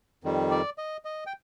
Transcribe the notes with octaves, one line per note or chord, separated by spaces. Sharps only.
F2 D#3 G3
D5
D#5
D#5
G5